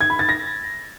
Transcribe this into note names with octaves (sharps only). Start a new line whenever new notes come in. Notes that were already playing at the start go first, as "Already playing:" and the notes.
G#6
B5
A6
A#6